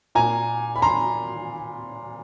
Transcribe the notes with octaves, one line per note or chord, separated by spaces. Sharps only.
A#2 G#5 A#5
B5
A#5 C6